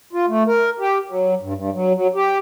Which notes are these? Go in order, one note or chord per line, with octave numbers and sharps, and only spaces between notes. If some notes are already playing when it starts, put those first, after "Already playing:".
F4
A3
A#4
G4
F#3
G2
G2
F#3
F#3
G4